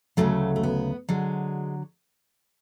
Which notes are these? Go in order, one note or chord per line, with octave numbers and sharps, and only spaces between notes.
D2 C#3 F#3 A3
A3
B3
D3 F#3 G#3